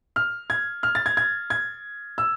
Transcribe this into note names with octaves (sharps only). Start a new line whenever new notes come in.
F6
G#6
F6
A6
G#6
G#6
G#6
E6